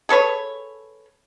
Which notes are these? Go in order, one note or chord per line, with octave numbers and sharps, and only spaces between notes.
G#4 A4 B4 C#5